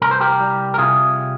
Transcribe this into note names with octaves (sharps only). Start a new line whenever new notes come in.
C2 A#4
C5
G4 A#4
G3
A#4
C3 F4 G#4